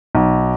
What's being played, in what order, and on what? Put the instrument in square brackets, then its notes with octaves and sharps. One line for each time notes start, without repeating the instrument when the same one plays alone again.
[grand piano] B1